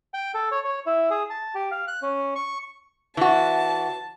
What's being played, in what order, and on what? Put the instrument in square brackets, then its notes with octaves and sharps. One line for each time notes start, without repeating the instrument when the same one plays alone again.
[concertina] G5
A4
C#5
C#5
E4
G#4
A5
G4
F5
F#6
C#4
C#6
[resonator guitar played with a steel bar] E3 F#4 [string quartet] A5